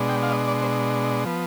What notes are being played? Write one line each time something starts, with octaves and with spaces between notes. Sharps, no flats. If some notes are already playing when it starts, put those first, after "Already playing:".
Already playing: B2 G#3 D4
G5
F5
D#5
D5
C5
F3 B3